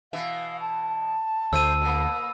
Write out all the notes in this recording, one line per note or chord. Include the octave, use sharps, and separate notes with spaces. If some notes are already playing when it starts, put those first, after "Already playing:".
B2 E3 E5 F5
A5
D2 A3 C5 E5 E6 D#7
B2 A#3